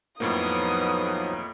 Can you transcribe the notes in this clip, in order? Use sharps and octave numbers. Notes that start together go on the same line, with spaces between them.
F2 A2 F3 F#3 A#3 B3 D#4 D#6